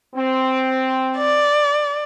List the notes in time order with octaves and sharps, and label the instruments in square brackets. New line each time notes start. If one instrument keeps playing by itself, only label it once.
[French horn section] C4
[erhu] D5